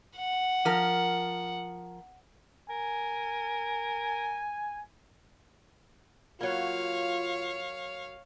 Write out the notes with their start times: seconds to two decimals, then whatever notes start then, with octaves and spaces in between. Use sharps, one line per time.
0.17 F#5
0.65 F3 A#4
2.70 A#4 G#5
6.41 F#3 A#3 F4 C#5 F5